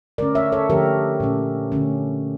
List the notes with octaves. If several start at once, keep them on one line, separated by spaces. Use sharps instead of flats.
D3 A3 C#4 A#4 D5
C#5 E5
A4 C#5
D3 F3 A3 G4 A#4
A#2 A3 C#4
D3 A3 C#4